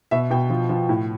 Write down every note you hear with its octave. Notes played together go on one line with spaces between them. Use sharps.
B2 E5
B2 G5
F3
F3
A2